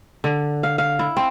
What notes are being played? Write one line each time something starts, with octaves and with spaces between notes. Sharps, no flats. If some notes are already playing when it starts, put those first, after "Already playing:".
D3
F5
F5
E4
C4